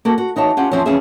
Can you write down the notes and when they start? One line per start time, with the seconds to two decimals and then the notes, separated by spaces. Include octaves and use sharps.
0.05 A#3 F#4 A4
0.18 F#4
0.36 E3 D#4 F#4 C#5 A5
0.57 C#4 F4 G4 F#5
0.71 E2 F3 C4 C#4 C#5
0.86 F2 E3 C#4 F4 G#4 E5